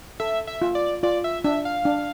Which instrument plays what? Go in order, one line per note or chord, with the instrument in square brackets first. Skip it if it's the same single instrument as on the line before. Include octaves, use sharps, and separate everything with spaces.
[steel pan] A4 [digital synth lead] E5
[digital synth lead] E5
[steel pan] F4
[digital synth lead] D5
[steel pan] F4 [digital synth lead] D5
[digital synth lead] E5
[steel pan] D4 [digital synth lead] E5
[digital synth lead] F5
[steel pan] D4